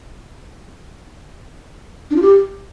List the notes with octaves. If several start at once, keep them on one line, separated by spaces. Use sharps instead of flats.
D4
F4
G4